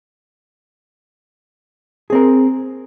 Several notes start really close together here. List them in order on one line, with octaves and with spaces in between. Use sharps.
G#4 C4 A#4